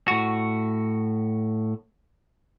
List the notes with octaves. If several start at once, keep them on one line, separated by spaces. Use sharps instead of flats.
A2 F#4